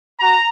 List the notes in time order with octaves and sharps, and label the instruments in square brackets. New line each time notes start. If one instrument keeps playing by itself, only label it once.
[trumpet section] F#4 A#5